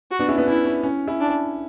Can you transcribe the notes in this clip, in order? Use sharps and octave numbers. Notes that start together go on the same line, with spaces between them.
F#4
B3 D4
C#4 E4
B3 D4
C#4 E4
C#4
C#4
C#4 E4
D4